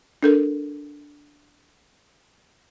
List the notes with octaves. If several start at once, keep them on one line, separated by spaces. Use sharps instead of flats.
D4 A4 A#4